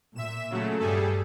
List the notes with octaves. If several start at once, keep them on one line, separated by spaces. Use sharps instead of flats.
A#2 E5 E7
C#3 F#3 A3
G2 G3 G#4 A4